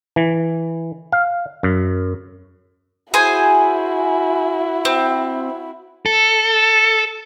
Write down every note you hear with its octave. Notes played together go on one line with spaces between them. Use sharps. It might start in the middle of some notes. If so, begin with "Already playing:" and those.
E3
F5
F#2
E4 F#4 G#4 C5 G#5
C4
A4